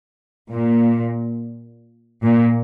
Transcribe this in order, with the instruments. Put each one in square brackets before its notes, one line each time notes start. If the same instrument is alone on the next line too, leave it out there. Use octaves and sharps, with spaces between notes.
[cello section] A#2
A#2